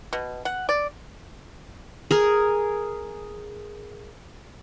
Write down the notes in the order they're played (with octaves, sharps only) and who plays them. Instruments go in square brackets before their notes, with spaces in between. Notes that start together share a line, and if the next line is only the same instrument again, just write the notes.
[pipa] B2
F#5
D5
[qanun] G#4 A#4